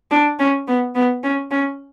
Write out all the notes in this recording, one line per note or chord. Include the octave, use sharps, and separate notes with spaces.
D4
C#4
B3
B3
C#4
C#4